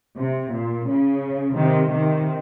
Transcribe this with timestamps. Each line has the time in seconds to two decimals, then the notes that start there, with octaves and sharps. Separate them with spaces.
0.19 C3
0.53 A#2
0.88 C#3
1.56 C3 D#3
1.91 C3 D#3